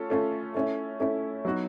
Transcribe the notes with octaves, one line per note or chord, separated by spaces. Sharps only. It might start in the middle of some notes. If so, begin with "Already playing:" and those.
Already playing: A3 C#4 F4 A4
A3 C#4 F4 A4
A3 C#4 E4
A3 C#4 E4
F#3 B3 D#4 F#4